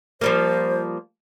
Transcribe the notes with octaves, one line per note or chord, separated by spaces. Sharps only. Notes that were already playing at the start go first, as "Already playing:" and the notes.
F3 G3 A#3 C5